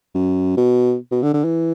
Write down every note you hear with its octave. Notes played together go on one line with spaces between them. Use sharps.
F#2
B2
B2
D3
D3
E3